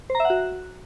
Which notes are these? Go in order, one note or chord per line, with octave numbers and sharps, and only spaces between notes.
C5
A#5
E5
F#5
F#4